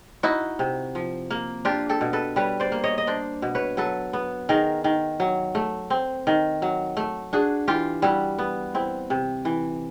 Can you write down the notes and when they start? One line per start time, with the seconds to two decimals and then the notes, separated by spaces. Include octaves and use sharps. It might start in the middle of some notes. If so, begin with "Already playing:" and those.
0.23 D#4 E4 F#4
0.59 C3
0.95 F3
1.31 A#3
1.65 D4 F4 G4
1.89 G4 A4
2.01 B2
2.13 A4 B4
2.36 G3 B4 C#5
2.60 C5 D5
2.72 A#3
2.84 C#5 D#5
2.98 D#5
3.07 D4 C5 D5
3.42 B2
3.55 B4 C#5
3.77 F#3 A4 B4
4.13 B3
4.49 D#3 G#4 A#4
4.84 D#3
5.20 F#3
5.55 A3
5.90 C4
6.27 D#3
6.62 F#3
6.97 A3
7.33 D4 F#4 G#4
7.68 E3 F4 G4
8.02 G3 E4 F#4
8.39 B3
8.75 C4 E4
9.10 C3
9.45 E3